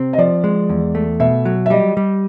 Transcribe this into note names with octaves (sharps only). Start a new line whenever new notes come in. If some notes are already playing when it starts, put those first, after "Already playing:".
Already playing: C3 C4
D#5
F3 D5
G#3
E2
A3
B2 E5
F#3
E5
G3 D#5
G3